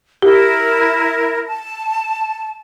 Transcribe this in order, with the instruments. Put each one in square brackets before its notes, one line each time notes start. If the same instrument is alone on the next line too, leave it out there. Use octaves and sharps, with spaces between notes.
[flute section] E4 A#4 [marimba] G4
[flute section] A5